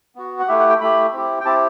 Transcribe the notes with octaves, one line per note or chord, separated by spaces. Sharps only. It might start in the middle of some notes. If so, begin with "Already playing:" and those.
B3 F#4
F#5
A3 E4 G4 E5
F#5
G5
A3 E4 G4 B5
C4 E4 G4
G5
C4 E4 G4 A5